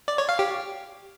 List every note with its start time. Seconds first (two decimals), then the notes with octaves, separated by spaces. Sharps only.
0.08 D5
0.18 C#5
0.29 F5
0.39 G4